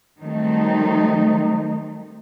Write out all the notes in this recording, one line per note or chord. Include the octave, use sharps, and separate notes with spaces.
D#3 F#3 G3 A3 C4 D#4